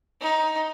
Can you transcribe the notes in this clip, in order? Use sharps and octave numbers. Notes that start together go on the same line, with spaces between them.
D#4